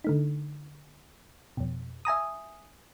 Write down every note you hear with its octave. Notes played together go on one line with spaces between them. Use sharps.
D3 A3 D#4
F2 B2
E5 G#5 A#5 D#6